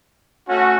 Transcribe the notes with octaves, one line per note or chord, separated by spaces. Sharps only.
A3 C#4 F#4